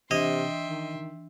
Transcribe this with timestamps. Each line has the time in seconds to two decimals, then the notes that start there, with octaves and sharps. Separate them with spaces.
0.11 C3 E3 D4 D#5 E5 G5 C6
0.66 D#3